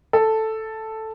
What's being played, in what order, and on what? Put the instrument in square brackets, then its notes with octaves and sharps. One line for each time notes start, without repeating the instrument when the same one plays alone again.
[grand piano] A4